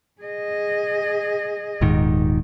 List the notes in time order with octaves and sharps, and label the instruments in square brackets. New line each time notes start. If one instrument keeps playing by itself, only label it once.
[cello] G#4 D#5
[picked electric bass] D#1 G#2 D#3